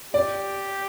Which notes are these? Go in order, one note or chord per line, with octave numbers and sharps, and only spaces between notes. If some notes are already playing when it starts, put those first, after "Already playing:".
G4 D5